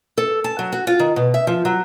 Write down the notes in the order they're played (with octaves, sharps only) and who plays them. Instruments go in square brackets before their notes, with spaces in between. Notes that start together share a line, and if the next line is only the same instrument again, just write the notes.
[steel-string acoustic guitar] A4
A5
F#3
F#4
F4
D#3
B2
E5
F3
F#3